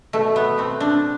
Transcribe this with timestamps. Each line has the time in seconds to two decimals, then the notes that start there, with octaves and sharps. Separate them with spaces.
0.13 B2 A3
0.36 B3
0.58 A3 C4
0.80 D4